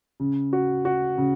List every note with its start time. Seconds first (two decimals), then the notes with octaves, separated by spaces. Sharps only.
0.20 C#3
0.53 F#4
0.85 F#4
1.18 C#3